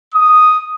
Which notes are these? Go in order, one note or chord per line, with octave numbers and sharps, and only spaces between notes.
D#6